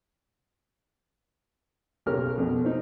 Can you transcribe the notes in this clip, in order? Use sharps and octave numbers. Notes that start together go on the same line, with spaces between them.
B1 C#3 C#4 G4 A#4 F6
F2 B2
C4 D#4